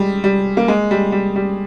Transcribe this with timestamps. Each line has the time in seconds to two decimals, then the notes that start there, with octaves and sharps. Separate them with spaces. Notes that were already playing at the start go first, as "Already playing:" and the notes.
Already playing: G3 G#3
0.24 G3
0.57 A#3
0.68 G#3
0.91 G3
1.12 G3
1.36 G3